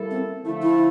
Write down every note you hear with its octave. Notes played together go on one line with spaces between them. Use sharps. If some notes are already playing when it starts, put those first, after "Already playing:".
Already playing: G3 A#3 E4 A4
C4
D3 F3 A3 E4
E4